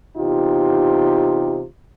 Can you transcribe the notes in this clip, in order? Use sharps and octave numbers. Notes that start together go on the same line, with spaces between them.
E2 C3 D#4 F4 G4